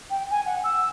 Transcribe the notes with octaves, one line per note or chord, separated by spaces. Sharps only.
G5
G#5
F#5
E6